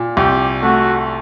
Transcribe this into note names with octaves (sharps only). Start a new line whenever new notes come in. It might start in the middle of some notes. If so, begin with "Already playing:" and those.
Already playing: A#2
C2 G4
A3 F#4